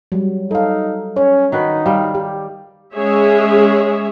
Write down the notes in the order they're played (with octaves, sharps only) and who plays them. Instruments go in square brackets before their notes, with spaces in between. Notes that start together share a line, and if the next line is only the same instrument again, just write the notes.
[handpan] F#3 G3
[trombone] D#4 [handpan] A4 F5
[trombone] C#4 [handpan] C#5
[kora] D#3 F#4 B4 [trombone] D#4
[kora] G3 [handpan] F5
[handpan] G4
[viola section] G#3 C#4 G#4 C#5 E5